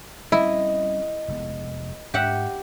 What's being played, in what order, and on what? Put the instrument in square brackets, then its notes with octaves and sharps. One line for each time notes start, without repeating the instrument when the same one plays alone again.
[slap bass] G3 C4 C#4 [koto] E4 [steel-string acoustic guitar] D#5
[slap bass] F1 G#3 B3
[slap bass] G#2 [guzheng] G4 E5 F#5